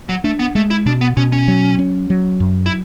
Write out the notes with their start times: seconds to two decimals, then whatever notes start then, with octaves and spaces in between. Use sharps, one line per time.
0.09 F#3
0.24 A3 D4
0.39 B3
0.55 G#3 A3
0.70 E4
0.86 B2 D4
1.01 B3
1.17 B2 C#4
1.32 C#4
1.48 F#3
1.79 C#4
2.10 F#3
2.40 F#2
2.66 E4